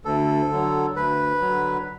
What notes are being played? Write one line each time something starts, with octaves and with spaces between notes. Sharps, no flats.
D2 A4
D3 F#3
D2 B4
D3 F#3